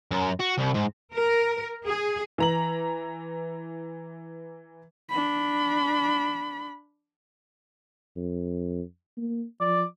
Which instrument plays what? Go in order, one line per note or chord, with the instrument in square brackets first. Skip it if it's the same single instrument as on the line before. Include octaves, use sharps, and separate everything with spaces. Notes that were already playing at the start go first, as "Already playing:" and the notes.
[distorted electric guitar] F#2
F#4
C2
G#2
[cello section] A#4
G#4
[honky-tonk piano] E3 A#5 F#7
[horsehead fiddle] D4 B5
[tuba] F2
A#3
[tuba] F3 [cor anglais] D5